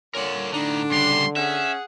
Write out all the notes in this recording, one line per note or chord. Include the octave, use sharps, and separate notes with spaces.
A#2 D3 A#4 C#5 F#5
A2 D3 D4 D#4
C#3 G3 C6
C#4 G#4 E5 F#5